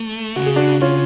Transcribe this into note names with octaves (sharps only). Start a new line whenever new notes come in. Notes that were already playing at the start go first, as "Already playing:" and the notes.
Already playing: A3
C#3 F#4
G#4
D4 F#4
C#3 C#4 F4